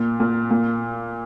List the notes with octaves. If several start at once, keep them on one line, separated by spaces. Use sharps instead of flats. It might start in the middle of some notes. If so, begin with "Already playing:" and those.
Already playing: A#2
A#2
A#2